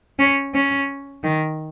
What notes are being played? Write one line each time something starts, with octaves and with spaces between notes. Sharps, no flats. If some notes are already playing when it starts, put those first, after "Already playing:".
C#4
C#4
D#3